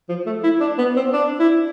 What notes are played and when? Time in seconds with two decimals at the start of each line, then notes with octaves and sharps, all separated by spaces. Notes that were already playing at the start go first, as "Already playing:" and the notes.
0.09 F3
0.26 A3
0.43 E4
0.61 D4
0.78 B3
0.96 C4
1.13 D4
1.39 E4